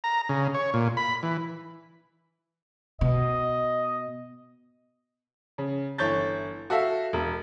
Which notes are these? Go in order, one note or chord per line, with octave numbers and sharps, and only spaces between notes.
A#5
C#3
C#5
A#2
B5
E3
B2 D#5
C#3
G1 E3 C#5 C#6 G6 A6
F#4 A4 E5 F5
E1